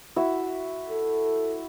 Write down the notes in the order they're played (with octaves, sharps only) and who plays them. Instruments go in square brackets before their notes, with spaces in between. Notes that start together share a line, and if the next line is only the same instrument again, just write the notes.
[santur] E4 F#4 E5
[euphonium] A4